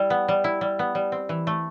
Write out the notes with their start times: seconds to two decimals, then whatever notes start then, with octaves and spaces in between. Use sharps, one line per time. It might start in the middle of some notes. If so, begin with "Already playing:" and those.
Already playing: G3 E4
0.10 B3
0.28 G3
0.44 E4
0.61 G3
0.79 B3
0.95 G3
1.12 C4
1.29 E3
1.47 A3